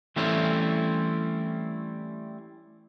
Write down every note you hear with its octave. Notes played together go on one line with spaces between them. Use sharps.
E3 G3 A3 C4 C#4 E4